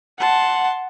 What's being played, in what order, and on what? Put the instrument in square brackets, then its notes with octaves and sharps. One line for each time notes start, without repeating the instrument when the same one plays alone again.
[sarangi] F#5 [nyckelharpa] A5 C6